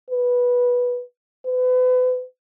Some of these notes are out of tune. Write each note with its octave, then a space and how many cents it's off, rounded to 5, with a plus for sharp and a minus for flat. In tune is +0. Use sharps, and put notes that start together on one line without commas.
B4 -10
B4 +35